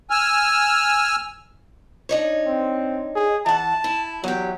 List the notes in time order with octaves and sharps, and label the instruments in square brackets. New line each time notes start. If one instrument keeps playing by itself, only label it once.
[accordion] G#5 E6 F6
[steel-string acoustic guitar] D4 D#4 C#5
[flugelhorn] C4
G#4
[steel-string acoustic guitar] E3 F#5 [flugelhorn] A5
[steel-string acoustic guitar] E4
[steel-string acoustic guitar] E2 G4 [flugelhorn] F#3